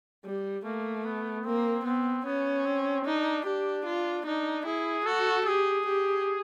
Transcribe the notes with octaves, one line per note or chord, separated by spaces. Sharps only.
G3
A3 A#3
B3
A#3 C4
B3 C4
B3 C#4
C4
D4 D#4
D4 G4
F4
D4 D#4
E4 G#4
F#4 A4
G4 G#4
G4